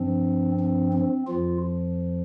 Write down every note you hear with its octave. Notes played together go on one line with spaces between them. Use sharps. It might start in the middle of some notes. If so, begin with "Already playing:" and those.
Already playing: G2 F3 C4
C4
C4
F2 F3 F4